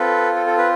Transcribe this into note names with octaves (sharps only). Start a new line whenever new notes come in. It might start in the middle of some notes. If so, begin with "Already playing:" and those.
Already playing: C4 F4 A4 B4
A4
A4
B4